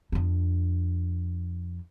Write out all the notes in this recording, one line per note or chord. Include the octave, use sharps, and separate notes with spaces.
F2 D4